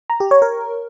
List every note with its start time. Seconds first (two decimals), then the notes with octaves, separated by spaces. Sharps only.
0.10 A#5
0.20 G4
0.31 C#5
0.42 A#4